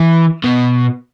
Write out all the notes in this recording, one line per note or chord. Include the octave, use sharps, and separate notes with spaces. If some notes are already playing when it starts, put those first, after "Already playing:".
Already playing: E3
B2